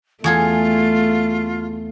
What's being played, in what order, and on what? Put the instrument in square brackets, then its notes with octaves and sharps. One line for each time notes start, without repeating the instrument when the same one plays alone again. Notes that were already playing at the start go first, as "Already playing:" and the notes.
[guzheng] E2 G#4 A4 [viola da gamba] A3 [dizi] F4